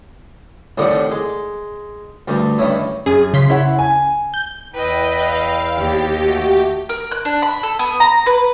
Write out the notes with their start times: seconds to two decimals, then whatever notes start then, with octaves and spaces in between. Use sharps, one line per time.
0.78 C2 A2 D#3 G3 D5 F#5
1.11 G#3
2.28 D2 G2 G3
2.58 G2 D#3 C#4 E4
3.06 F#2 G#4
3.34 C#3 C6 B6
3.50 E4 C#5 F#5
3.79 G#5
4.34 G6
4.74 E2 E4 B4 D#5 G5
5.21 F5
5.76 D#2 G4
6.24 A3 F#4
6.89 A#4
7.11 F#6
7.25 D4
7.42 B5
7.63 A4
7.79 B3
8.00 A#5
8.26 B4